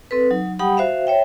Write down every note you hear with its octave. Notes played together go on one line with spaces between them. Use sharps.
C4 A4 B4
F#3 D#4
G3 G4 F#5 G5 B5 D#6
F#4 C5 E5 F5
C#5 E5 G5